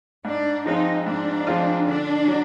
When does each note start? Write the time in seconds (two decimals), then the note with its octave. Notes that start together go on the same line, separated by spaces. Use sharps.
0.25 G#2 D4
0.66 F3 G#3 C4 D#4 F4
1.06 G#2 D4
1.47 F3 G#3 C4 F4
1.87 D3 D4
2.28 F#3